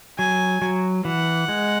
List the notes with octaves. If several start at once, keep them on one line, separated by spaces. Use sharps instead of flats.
F#3 G#5
F#3
E3 F#5
G#3